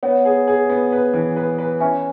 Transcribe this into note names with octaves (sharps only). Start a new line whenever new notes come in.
B3 C#5 F#5
G#4
G#4
B3
B4
E3
B4
B4
C#4 E5 G#5